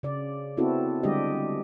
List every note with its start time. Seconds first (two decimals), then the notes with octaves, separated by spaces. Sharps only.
0.03 C#3 D5
0.57 B3 C4 E4 F#4 A4
1.03 D3 G3 G#3 D4 G4 D#5